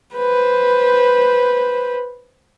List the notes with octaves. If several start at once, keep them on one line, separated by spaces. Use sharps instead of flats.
B4 C5